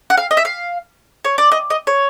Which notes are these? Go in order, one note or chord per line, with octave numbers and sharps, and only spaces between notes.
F#5
F5
D#5
E5
F5
C#5
D5
D#5
D#5
C#5